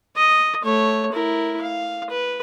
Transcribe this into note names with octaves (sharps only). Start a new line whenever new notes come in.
D#5
A3 C#5
E4 A#4
F5
B4